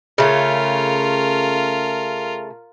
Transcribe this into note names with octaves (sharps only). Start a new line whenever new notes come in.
C#3 A3 F4 A#4